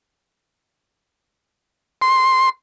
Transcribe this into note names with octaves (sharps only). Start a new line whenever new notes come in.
C6